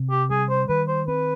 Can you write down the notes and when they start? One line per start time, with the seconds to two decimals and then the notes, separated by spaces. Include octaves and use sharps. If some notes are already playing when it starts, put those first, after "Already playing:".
Already playing: C3
0.11 G4
0.30 G3 G#4
0.49 C5
0.69 D#3 B4
0.88 C5
1.07 C4 B4